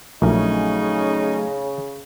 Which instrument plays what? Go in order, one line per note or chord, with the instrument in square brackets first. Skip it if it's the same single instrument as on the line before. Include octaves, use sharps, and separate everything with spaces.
[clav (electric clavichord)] A#1 A#2 A#4 [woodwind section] C#3 [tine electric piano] F#3 A3 [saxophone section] C#4 D#4